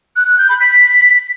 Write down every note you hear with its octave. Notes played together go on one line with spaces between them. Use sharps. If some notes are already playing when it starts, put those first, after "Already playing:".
F#6
F#6
G6
B5
B6